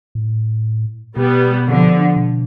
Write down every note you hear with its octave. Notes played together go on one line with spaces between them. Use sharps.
A2
B2 G3 B3
D3 F3
B2